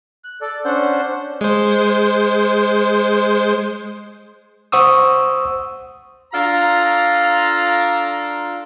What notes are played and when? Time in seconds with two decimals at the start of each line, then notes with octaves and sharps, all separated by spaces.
0.24 F#6
0.41 A4 D5
0.65 C#4 D4 C5 F#5 G6
1.41 G#3 C5
4.72 C5 F#5 C#6 D#6 E6
6.33 D4 F4 A4 F5 A#5